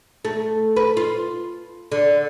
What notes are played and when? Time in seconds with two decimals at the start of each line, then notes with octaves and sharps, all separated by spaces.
0.25 A3
0.76 B4
0.97 F4
1.92 D3